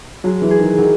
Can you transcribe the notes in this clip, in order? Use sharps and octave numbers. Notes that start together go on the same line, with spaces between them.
F#3 G#3
E3
G#4
D#3
D#3 F#3